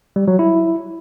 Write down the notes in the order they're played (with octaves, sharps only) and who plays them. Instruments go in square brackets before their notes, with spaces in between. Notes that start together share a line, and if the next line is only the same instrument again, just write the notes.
[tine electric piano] G3
F#3
E4